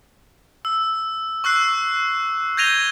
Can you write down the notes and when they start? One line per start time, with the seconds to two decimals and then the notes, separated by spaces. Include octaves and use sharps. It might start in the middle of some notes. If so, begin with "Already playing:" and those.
0.65 E6
1.44 C#6 E6 F#6 C7
2.57 G6 G#6 A#6 D#7 F7 G7